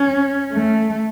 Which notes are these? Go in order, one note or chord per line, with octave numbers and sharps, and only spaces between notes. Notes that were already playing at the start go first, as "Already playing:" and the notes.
Already playing: C#4
A3